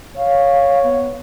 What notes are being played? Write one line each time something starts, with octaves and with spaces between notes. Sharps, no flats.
C#5 F5
B3